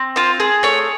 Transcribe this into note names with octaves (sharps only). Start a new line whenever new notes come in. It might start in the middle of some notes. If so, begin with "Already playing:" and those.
Already playing: C4
F4 C5
G#4
A3 C#5